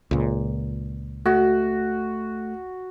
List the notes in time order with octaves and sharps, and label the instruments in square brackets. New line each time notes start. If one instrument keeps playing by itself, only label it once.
[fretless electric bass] C#2 A#2
[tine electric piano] A3 [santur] F#4